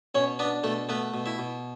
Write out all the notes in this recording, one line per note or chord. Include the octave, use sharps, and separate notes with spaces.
B2 C#4 C#5
B3 D4 B4
B2 A3 A4
A3 B3 B4
B2
E4 E5
B2